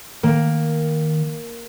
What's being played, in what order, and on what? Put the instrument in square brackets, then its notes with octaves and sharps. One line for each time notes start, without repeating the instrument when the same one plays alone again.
[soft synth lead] D#3 [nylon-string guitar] A#3